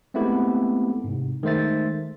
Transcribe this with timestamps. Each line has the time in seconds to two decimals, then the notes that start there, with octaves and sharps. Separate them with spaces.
0.14 G#3 A3 B3 C4 E4 G4
1.04 G#2 C3
1.43 D#3 G#3 A3 C5 E5 A6